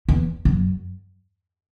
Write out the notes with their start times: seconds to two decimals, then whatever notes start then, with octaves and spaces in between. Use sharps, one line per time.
0.09 E2
0.45 F#2